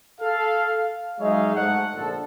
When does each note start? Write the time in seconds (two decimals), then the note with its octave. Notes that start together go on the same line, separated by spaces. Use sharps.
0.20 A4 F5
0.75 F5
1.19 F#3 G#3 D#4 C#5 E5 F5
1.56 G#2 A3 F#5
1.94 A#1 D3 F3 A4